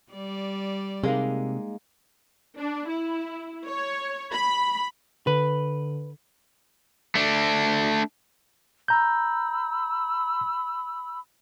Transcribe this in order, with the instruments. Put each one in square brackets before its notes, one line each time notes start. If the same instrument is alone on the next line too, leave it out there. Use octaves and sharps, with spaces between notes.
[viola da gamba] G3 D5
[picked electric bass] C3 [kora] G#3 A#3 D#4
[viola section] D4
E4
C#5
B5
[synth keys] D3 [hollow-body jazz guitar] B4
[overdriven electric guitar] A3 D4
[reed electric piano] A#5 G6 [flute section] B5 E6